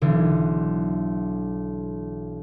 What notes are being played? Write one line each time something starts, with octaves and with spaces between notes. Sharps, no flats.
B1 D3 E3